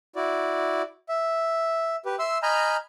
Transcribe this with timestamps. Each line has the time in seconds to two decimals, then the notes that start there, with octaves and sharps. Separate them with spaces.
0.16 E4 F#4 D5
1.09 E5
2.06 G4 B4
2.19 E5 C6 E6
2.43 D#5 G#5 A#5 B5 F6 G6